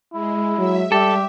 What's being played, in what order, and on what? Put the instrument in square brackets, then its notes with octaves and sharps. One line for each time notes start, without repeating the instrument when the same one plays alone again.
[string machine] G#3 [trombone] E4
[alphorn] F#3 [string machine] E5
[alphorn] G3 [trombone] G4 [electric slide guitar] A4